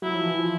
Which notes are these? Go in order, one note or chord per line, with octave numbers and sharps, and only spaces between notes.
F#3 E4
F3
E3
F3